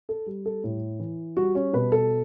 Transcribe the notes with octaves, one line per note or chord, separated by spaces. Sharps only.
A4
G3
A4
A2
E3
G3 F#4
C#4
B2 B4
A4